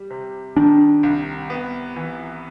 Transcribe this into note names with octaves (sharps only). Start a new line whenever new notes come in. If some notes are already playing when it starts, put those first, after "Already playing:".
Already playing: G3
C3
D#3 D4
C2
B3
E3